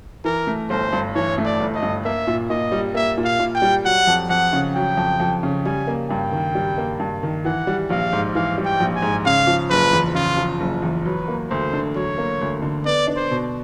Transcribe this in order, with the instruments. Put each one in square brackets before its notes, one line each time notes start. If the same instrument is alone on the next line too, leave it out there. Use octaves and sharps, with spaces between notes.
[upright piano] E3 [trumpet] A#4
[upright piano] A3
[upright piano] G1 [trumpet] C5
[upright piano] G2
[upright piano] E3 [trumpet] C#5
[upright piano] A3
[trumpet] D5
[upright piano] G1
[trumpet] D#5
[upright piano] G2
[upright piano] A#3 [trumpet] E5
[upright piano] A#2
[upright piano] A#2 [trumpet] D#5
[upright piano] G3
[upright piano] A#3 [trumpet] E5
[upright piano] A#2
[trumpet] F5
[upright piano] A#2
[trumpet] G5
[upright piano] G3
[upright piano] F#3 [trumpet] F#5
[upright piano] F2
[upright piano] F2 [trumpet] F#5
[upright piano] C#3
[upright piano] F#3 [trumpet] G5
[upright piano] F2
F2
C#3
[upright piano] G3 [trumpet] G#5
[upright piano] A#3
[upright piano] G2 [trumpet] G5
[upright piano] D#3
G3
A#3
G2
D#3
[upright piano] E3 [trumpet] F#5
[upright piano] G3
[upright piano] A#1 [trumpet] F5
[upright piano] G#2
[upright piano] E3 [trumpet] F5
[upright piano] G3
[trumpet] G5
[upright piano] A#1
[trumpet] G#5
[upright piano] G#2
[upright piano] C#3 [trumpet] F5
[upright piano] F3
[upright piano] F#1 [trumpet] B4
[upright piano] E2
[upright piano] C#3 [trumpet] F4
[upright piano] F3
F#1
E2
[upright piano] F#3 [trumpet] B4
[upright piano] A#3
[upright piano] D2 [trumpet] C5
[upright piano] D3
[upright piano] F#3 [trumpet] C#5
[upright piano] A#3
D2
D3
[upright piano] B3 [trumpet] D5
[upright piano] D4
[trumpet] C5
[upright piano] B2